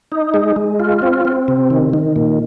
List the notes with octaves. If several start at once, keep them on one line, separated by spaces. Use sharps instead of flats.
D#4
G#3
G#3
F4
C4
C4
C3
D#3
D#3
A#2